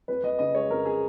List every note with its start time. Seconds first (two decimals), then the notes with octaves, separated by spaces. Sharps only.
0.08 F2 B4
0.23 F2 D#5
0.39 C#3 D#5
0.55 G#3 C#5
0.70 F2 A#4
0.85 G#4